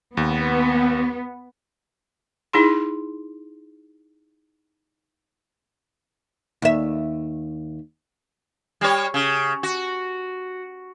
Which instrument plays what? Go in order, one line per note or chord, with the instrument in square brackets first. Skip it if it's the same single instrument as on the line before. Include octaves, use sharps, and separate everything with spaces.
[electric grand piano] D#2 [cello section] B3
[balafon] D#4 E4 G#4 C6
[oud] D#2 E5
[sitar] G3 C#5
C#3
F#4